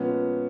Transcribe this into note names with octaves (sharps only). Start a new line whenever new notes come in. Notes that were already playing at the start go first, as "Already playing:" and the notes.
Already playing: A#2 F3 G#3 B3 C#4